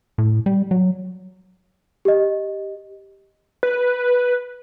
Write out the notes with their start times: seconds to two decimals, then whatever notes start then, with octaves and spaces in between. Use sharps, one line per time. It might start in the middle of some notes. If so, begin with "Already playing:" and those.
0.18 A2
0.46 G3
0.71 F#3
2.05 G4 D#5
3.63 B4